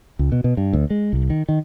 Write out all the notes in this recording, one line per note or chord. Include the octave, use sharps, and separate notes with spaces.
C#2
B2
B2
G2
D2
G#3
C2
D#3
D#3